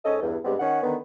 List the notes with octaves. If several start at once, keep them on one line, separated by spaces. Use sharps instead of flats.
G#2 C#4 A4 D#5
E2 G2
G2 G3 G#3 B3 C4
D#3 C#4 F#5
D3 D#3 B3